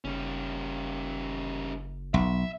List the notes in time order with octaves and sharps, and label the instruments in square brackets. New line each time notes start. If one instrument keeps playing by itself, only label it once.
[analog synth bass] F#1 [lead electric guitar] G3 C#4
[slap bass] B1 [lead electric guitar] E5